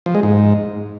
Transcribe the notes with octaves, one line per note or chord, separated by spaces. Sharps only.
F3
G#3
G#2